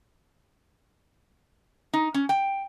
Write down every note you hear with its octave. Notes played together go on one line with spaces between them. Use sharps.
D#4
C#4
G5